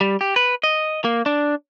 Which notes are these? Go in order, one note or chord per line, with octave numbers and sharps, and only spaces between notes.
G3
G4
B4
D#5
A#3
D4